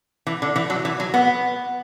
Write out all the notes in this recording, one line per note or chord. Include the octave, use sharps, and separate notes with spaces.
E3
D3
E3
F#3
E3
F#3
B3